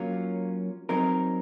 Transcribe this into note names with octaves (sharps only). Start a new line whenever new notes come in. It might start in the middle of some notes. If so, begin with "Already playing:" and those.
Already playing: F#3 A#3 C#4 F4
F#3 C4 D#4 A#4